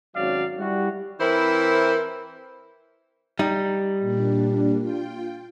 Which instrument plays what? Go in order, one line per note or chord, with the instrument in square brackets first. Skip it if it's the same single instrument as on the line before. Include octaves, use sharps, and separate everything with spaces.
[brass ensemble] G#1 F#3 C#4 F#4 D5 F5
G3 E4 F#4
[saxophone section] E3 C4 E4 A#4 C5
[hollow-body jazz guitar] G3 D#4
[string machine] A#2 D4
F4 G5